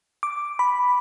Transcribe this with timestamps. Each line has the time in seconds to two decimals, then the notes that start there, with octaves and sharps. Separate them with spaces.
0.23 D6
0.59 B5